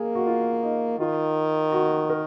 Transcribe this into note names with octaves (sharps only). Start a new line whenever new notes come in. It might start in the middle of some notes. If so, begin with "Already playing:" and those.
Already playing: A#3 G#4 A#4
F#4
F4
D#4
D#3 F4
F#4
A#4